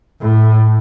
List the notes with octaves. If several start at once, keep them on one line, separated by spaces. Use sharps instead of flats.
A2